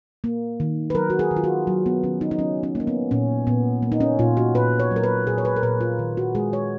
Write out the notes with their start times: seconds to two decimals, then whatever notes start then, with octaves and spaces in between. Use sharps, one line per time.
0.24 A#3
0.60 D#3
0.90 B4
0.95 F#3 A#4
1.10 F#4
1.19 G#4
1.31 D#3
1.37 F4
1.44 F#4
1.67 F#3
1.86 B3
2.04 D#3 C#4
2.21 D#4
2.31 D#4
2.39 F#3 C#4
2.63 C#4
2.75 A#3 C#4
2.87 B3
3.11 A#2 C#4
3.47 A#2 B3
3.82 A#3
3.92 D#4
4.00 C#4
4.19 A#2 F4
4.37 F#4
4.55 A#2 B4
4.80 C#5
4.91 F#3
4.96 A#4
5.04 B4
5.27 A#2 G#4
5.38 C#5
5.45 B4
5.56 A#4
5.63 A#2 B4
5.81 F4
5.99 D#3
6.17 F#4
6.35 G#3 G#4
6.53 C#5